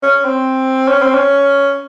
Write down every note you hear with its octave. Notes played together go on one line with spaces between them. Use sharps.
C#4
C4
C#4
C4
C#4